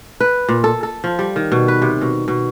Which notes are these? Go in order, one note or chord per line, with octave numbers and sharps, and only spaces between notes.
B4
A#2
A4
A4
F3
G3
D#3
B2
B4
C3
B2
B2